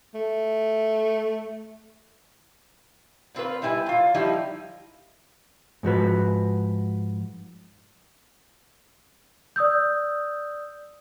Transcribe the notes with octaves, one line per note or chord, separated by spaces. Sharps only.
A3
A#2 C4 F4 B4
B2 G3 E4 G#5
A#2 F4
F3 G3 D#4 E4
G#2 F3 F#4 B4
D5 D#6 E6 G6